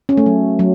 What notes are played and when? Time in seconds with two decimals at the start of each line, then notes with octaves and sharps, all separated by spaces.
0.09 C#4
0.17 A3
0.26 F#3
0.59 F#3